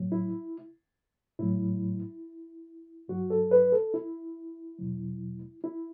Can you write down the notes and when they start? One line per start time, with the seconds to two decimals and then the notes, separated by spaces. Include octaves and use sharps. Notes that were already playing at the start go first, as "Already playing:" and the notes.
Already playing: A2 F#3
0.12 E4
1.39 A2 F#3 E4
3.08 G2 F#3 F#4
3.30 A4
3.51 B4
3.72 A4
3.94 E4
4.79 E2 B2 F#3
5.64 E4